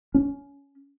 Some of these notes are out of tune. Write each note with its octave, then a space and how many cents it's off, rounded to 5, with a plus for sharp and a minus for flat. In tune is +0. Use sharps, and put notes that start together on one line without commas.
C#4 +20